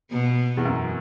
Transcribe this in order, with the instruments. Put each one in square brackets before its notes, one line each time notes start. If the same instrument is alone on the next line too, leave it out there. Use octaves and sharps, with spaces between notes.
[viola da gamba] B2 B3
[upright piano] E2
F#2